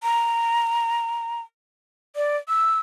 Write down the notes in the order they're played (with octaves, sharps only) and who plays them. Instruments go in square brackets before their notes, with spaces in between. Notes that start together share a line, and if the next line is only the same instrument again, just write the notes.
[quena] A#5
D5
E6